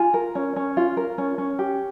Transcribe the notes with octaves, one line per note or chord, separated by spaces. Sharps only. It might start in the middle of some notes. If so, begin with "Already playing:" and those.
Already playing: F4 G#5
A#4
C#4
C#4
F4
A#4
C#4
C#4
G4